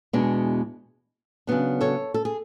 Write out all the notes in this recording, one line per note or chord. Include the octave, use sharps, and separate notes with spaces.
E2 B2 G#3 B3 D4
C#3 F#3 B3 D4
A4 C#5
A4
G#4